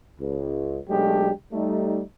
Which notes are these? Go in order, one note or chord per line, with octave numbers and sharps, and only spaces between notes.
C#2
B1 F#3 G#3 A3 D4 G4
G3 A3 D#4